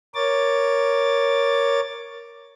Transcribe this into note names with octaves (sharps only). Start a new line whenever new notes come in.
A#4 C#5 D6 A6